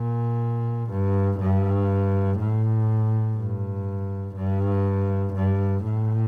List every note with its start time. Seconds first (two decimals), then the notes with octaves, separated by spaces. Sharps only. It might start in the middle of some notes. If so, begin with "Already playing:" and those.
Already playing: A#2
0.91 G2
1.40 G2
2.39 A2
3.37 G2
4.36 G2
5.34 G2
5.84 A2